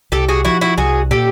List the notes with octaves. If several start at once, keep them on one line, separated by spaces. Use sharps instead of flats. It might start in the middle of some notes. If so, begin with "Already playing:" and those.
C2 G4 A4
F#4 G#4
F3 E4 F#4
E4 F#4
C2 F#4 G#4
A#2 G4 A4